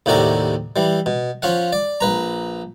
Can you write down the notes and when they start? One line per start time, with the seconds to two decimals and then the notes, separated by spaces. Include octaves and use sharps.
0.06 D#2 A2 C3 F#4 D5 A#5
0.76 E3 G3
1.06 B2
1.42 F3 C#4 F5 F#5
1.73 D5
2.01 A#1 B4 A#5